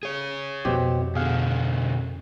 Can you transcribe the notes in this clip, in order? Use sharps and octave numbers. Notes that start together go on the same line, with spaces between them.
G#4 C#5
F2 B2 C4 G4
B2 D3 G#4 F5 F#5